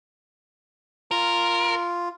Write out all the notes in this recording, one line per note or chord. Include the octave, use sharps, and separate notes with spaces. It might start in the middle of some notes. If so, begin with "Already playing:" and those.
F4 A#4